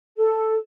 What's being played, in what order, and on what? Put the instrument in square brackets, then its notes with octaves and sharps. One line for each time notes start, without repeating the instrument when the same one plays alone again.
[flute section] A4